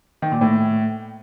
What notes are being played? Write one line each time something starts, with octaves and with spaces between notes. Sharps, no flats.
D#3
A#2
A2